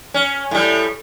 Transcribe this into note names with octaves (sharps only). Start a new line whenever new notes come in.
C#4
A2 G3